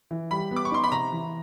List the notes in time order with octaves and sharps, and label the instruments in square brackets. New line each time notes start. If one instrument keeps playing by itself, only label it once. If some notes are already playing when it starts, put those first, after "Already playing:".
[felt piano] E3
[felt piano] G3 [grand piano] B5
[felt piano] B3
[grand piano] D6
C#6
[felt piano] D#4 [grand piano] C6
[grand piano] B5
[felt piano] C3 [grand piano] A#5
[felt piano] E3